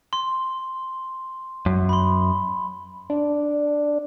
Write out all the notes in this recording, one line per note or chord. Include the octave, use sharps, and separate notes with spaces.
C6
F#2
B5 C6
D4